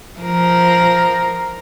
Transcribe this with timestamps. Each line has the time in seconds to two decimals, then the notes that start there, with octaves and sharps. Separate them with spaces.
0.20 F3 A#4